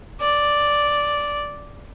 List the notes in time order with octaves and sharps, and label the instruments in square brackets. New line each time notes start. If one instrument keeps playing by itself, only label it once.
[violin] D5